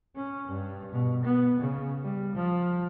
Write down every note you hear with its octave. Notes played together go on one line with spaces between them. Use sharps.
C#4
G2
B2
B3
C#3
G3
F3